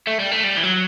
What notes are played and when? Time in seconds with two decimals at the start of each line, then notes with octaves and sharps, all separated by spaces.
0.07 A3
0.20 G3
0.32 A3
0.44 G3
0.57 E3
0.64 F#3